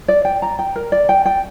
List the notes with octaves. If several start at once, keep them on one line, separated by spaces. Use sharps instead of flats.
D5
G5
A#5
G5
A#4
D5
G5
G5